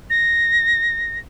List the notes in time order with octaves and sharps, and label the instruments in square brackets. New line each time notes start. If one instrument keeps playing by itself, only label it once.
[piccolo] A#6